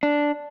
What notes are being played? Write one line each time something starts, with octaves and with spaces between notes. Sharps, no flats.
D4